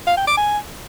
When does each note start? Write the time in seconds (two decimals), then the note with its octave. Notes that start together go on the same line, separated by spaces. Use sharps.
0.07 F5
0.17 G5
0.27 D6
0.37 G#5